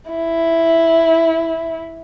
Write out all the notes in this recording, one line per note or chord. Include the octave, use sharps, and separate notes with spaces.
E4